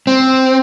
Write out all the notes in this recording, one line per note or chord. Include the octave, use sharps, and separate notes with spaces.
C4